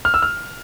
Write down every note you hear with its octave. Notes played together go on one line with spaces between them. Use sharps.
F6
E6
F6